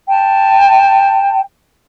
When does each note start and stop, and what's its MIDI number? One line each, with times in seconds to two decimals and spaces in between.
0.08 1.40 79
0.08 1.40 81